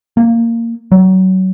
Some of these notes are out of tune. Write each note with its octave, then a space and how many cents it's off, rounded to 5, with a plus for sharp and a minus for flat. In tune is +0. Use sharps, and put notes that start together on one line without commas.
A#3 -15
F#3 +20